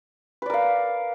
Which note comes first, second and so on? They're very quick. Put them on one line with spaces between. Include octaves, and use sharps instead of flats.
B4 D5 A#4 F5